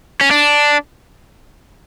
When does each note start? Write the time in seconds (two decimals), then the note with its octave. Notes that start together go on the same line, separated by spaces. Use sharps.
0.21 C#4
0.31 D4